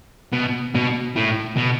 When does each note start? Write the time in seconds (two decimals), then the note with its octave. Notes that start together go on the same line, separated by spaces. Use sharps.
0.33 B2
0.75 B2
1.16 A2
1.57 B2